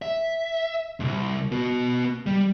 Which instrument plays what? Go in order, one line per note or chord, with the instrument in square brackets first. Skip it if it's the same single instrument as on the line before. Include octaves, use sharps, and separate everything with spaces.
[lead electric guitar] E5
C2 G#2
B3 F#4
G3